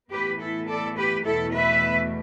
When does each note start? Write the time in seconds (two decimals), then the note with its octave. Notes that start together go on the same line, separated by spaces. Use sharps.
0.11 A2 E3 B3 G4 B4
0.40 E4 A4
0.68 A4 D5
0.96 G4 B4
1.25 E2 B2 A3 E4 A4
1.53 B4 E5